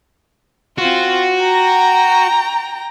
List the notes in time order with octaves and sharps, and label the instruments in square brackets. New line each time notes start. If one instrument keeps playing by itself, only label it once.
[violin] C4 F4 [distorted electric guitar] F#4
[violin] G5 A#5